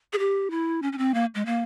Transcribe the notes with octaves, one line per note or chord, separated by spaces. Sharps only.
G#4
G4
E4
C#4
C#4
C4
A#3
G#3
A#3